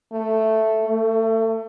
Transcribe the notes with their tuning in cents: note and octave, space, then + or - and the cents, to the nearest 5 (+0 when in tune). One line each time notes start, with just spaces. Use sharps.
A3 +0
A3 +30